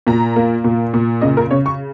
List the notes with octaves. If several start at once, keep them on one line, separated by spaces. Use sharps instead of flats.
A#2 A#5
A#3
A#2
A#2
C#3 D#5
A#4
C#3 C#5
C#6